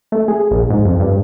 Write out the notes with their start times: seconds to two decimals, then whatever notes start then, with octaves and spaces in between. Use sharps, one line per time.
0.12 A3
0.28 G#4
0.51 A#1
0.70 G#2
0.85 F2
0.99 G2